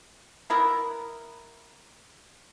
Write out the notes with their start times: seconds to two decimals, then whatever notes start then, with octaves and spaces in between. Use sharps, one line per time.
0.50 B3 E4 A#4